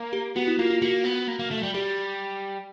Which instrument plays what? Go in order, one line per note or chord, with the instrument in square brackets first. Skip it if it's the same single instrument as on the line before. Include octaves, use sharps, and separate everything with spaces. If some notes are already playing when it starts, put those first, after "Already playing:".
Already playing: [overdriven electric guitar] A#3
[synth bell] G4
[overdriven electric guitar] B3 [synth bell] F#4
[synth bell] E4
[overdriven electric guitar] A#3 [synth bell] F4
[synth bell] F4
[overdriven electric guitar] A#3 [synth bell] F#4
[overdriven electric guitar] B3
A#3
A#3
A3
G3
[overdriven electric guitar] G3 [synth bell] G4